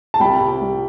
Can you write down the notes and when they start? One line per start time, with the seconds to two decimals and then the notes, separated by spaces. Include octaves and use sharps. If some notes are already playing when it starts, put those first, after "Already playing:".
0.14 A5
0.20 C2 G5 B5
0.40 C3
0.61 C2